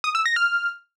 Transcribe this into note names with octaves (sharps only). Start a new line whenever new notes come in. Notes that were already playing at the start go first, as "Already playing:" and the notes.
D#6
E6
A#6
F6